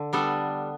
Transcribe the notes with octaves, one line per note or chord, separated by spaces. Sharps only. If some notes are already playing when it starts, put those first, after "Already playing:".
Already playing: D3
G3 B3 D4 A4